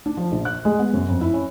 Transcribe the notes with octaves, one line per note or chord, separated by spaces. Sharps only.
D4
F3
A#1
F#6
G#3
B3
F#2
F2
E4
C#4